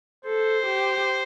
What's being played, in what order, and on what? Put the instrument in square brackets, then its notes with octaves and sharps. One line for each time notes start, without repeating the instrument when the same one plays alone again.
[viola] A4 [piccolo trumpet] C5
[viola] G4